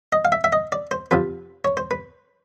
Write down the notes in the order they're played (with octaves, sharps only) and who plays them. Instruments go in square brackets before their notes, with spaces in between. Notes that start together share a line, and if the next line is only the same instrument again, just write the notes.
[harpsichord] D#5
F5
E5
E5
D#5
D5
C5
F2 C3 F3 B4
C#5
C5
B4